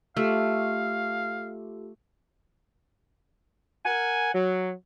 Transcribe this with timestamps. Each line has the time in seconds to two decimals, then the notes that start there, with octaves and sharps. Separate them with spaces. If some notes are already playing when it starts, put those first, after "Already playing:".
0.17 A3 F4 G4 A4 F5
3.84 A#4 F#5 G#5
4.33 F#3